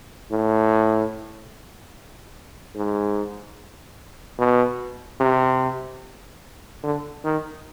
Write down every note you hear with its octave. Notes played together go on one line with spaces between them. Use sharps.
A2
G#2
B2
C3
D3
D#3